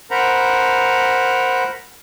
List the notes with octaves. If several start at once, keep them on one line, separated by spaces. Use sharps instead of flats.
A#4 C5 F#5 A#5 B5